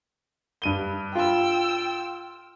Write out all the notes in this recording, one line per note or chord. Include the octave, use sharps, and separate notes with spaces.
G2 D#7 G7
F4 G5 E6